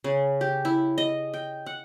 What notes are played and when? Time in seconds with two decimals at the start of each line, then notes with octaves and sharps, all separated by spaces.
0.04 C#3
0.41 G4
0.65 E4
0.98 D#5
1.34 G5
1.66 F#5